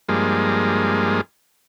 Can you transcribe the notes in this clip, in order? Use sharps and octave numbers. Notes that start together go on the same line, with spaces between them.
G2 F3 G#3 A#3